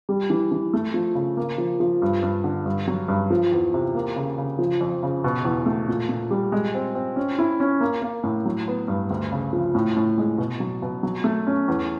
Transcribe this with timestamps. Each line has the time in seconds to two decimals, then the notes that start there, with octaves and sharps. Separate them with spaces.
0.09 G3
0.30 E3
0.52 E3
0.73 A3
0.94 F3
1.15 C#3
1.37 A#3
1.58 F3
1.80 F3
2.02 G2
2.23 G2
2.44 D3
2.66 G2
2.87 F#3
3.08 G2
3.30 F3
3.52 E2
3.74 C3
3.95 A#3
4.16 C#3
4.38 C#3
4.59 F3
4.81 F2
5.03 C#3
5.24 B2
5.45 E2
5.66 A3
5.88 A#2
6.09 A#2
6.31 G3
6.52 G#3
6.74 C4
6.95 C4
7.16 C#4
7.39 E4
7.60 C#4
7.81 A#3
8.02 A#3
8.24 A2
8.45 F#3
8.68 B3
8.88 G2
9.10 D2
9.32 C#3
9.53 F3
9.75 A2
9.96 A2
10.18 G#3
10.38 B2
10.60 F#3
10.82 B2
11.03 F#3
11.24 A3
11.47 C#4
11.68 E2